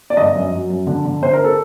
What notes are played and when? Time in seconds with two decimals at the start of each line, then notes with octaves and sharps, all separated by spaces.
0.10 D5
0.17 G1 D#5
0.35 F#2
0.52 F#3
0.70 F#2
0.87 D3
1.05 D3
1.22 D3 C5
1.33 A#4
1.44 A4